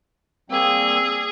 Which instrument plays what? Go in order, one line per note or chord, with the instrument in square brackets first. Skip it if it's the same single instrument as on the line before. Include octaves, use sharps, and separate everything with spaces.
[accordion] G3 A#3 C4 [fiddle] G#4 [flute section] E6